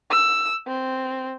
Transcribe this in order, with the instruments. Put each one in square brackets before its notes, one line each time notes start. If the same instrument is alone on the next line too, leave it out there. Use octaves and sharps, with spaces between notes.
[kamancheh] E6
C4